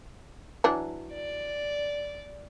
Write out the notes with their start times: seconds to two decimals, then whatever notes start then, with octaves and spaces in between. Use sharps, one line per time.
0.64 E3 F#3 D4
1.14 D5